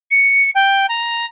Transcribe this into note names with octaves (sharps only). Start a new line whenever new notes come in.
C#7
G5
A#5